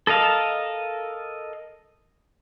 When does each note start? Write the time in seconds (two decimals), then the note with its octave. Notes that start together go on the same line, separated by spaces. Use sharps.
0.07 A4 A#4 D#5 F5 A5